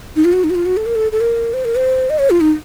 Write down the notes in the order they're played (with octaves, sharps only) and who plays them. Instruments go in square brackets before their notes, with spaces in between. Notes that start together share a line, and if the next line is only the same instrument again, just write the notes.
[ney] D#4
F4
F#4
D#4
F#4
F4
F#4
A4
A#4
A4
A4
A#4
C5
A#4
C5
D#5
C#5
F4
D#4